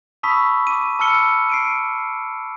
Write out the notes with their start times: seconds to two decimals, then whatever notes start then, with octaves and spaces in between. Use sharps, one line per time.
0.23 A5 B5 C#6 D#6 E6 B6
0.67 D6 D#7
0.99 A5 B5 E6 F6 C#7 G7
1.50 C7 D7 D#7